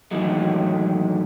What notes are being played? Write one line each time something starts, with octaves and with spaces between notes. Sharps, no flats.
A2 D#3 E3 F#3 G#3